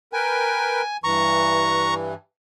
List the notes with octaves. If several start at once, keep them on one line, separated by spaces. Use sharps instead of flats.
A#4 B4 G5 G#5
G2 E3 A#5 C#6